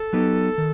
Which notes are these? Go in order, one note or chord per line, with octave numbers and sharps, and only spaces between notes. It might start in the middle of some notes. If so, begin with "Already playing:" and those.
Already playing: A4
F#3 B3 D#4 G4
D#3